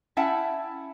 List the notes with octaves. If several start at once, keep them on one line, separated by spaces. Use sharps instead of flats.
C#4 E4 E5 F#5 G5 A5